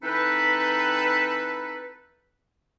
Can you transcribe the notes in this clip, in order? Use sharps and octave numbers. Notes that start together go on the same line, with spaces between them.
E3 C4 D#4 A4 B4